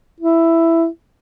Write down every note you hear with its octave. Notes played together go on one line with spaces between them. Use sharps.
E4